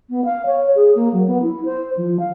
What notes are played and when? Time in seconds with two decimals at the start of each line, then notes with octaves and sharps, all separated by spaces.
0.10 B3
0.25 F5
0.46 C#5
0.75 G#4
0.95 A#3
1.13 F#3
1.27 B3
1.42 E4
1.65 C5
1.97 F3
2.19 F5